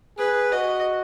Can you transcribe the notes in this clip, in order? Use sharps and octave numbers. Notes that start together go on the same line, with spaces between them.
G#4 B4
F#4 D#5